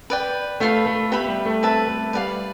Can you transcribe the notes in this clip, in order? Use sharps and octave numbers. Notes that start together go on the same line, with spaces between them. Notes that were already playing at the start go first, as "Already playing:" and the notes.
B4 D5 G5
A3 F4 B4 F5 B5
A3
B3 G4 B4 E5 B5
G3
A3
C4 B4 E5 A5
A3
G3 B4 D5 F5